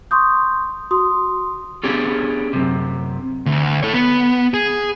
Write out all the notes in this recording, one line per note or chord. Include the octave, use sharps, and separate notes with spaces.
C6 C#6 D#6 G6
F#4 C6 D#6
B3 C#4 D4 G4 G#4
F#2 C3
D2
A4 C#5
B3
G#4